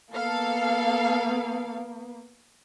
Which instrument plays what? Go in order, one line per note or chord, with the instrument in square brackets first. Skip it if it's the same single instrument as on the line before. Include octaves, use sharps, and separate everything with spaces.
[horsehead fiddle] A#3 B3 [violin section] A4 F5